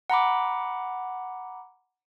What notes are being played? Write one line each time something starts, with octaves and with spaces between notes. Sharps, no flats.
F#5 A#5 B5 D6